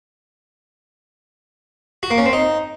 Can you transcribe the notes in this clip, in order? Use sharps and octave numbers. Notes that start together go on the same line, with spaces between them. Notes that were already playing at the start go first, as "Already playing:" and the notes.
F#4
A#3
C#4
C4
D#4